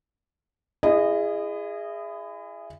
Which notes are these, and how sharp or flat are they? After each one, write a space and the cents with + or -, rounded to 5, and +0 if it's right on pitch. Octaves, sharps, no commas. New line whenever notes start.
E4 +30 G#4 -10 D#5 -20